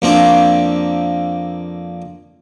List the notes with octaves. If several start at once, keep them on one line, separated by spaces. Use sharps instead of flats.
F2 A#3 C4 D4